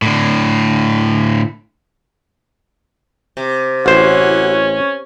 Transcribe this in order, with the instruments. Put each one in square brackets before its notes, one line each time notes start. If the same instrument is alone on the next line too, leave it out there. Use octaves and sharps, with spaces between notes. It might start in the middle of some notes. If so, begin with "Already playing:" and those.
[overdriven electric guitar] A2 D3
[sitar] C3
[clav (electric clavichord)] A1 C5 [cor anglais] C#4 [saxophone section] E4 F#4 F#5